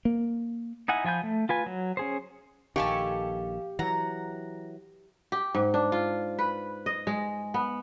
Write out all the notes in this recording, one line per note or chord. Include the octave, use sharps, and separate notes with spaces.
A#3
D#4 E4 F#5 G#5
F3 F4 G#5 B5 G6
A3
F4 B4 G#5
F#3
C#4 G#4 C5
A#1 D#3 G4 A4 F5 G#5 C#6
E3 F#3 F#5 A#5 A#6
G4
G#2
D4
F4
B4
D#5
G#3
B3